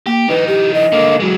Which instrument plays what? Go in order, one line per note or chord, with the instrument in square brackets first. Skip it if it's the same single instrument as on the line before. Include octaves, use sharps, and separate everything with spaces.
[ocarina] A#3 [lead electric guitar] G4
[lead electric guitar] E3 D#4 [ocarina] B4
[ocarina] G4
D#5
[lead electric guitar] D3 A#3
F#3 G#3